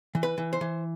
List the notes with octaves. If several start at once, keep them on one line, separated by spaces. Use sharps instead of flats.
E3
B4
E3
C5
E3